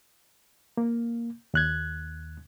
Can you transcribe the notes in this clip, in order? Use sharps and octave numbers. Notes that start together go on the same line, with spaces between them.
A#3
D#2 F#6 G#6